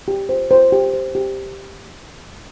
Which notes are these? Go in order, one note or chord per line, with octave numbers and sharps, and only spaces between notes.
G4
C5
C5
G4
C5
G4